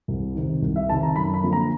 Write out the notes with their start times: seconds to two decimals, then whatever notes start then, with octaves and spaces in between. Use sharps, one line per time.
0.08 C2
0.35 C3 D#3
0.62 C2
0.76 E5
0.89 C3 D#3 A5
1.03 A#5
1.16 F#2 B5
1.34 B5
1.43 D3 F3 A#3
1.53 A#5